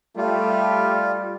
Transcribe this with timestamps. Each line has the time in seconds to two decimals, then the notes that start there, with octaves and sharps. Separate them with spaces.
0.17 G3 A3 F4